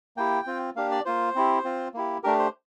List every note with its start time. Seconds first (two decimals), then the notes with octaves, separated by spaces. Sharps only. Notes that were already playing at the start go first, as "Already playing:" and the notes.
0.17 A#3 E4 G4 G5
0.47 C4 F4
0.76 A#3 D4 G4 F5
0.91 D5
1.05 A#3 F4 C5
1.35 C4 E4 G4
1.65 C4 F4
1.94 A#3 E4 G4
2.23 A3 D4 G4 A#4
2.39 C5